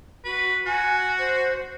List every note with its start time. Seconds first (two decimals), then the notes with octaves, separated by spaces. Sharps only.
0.25 F#4 B4
0.66 F#4 G#5
1.18 C5